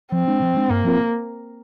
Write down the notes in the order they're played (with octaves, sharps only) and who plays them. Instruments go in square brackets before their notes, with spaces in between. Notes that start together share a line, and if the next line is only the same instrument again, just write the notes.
[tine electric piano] F3 [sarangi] C4
[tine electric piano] G#3 D4
F3
G#3 D4
[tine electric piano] G2 [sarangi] A#3
[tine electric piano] F3 C4 F4 A#4